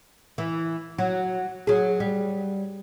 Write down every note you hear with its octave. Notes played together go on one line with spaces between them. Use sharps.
E3
F#3
F#3 G#4
G3